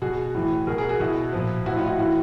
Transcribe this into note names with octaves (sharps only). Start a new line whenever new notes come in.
B2 F#4 G#4
A2 E3
B2 G#4 A#4
G#4 A#4
F#4 G#4
B2 E4 F#4
A#2 F3
A2 F3 E4 F#4
D#4 F4
E4 F#4
A2 E3 E4 F#4